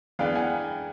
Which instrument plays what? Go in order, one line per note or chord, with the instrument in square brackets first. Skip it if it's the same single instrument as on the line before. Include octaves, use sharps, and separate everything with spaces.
[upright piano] E3 G#3 B3 D4 [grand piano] F5 G5
[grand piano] F#5 G#5